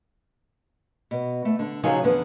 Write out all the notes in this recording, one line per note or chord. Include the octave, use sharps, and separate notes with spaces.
B2
A3
D3
C#3 F3 F#3 D#4 A4 G#5
E2 D3 B3